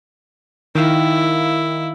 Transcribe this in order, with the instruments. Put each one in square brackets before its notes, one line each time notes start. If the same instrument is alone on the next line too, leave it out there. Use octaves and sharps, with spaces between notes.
[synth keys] D#3 F5 [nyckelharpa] E4